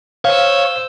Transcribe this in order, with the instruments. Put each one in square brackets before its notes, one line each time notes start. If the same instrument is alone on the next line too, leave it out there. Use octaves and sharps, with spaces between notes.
[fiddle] C5 E6 [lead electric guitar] C#5 [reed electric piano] F5